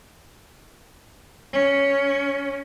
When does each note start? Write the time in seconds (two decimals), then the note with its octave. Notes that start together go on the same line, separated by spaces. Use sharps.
1.53 C#4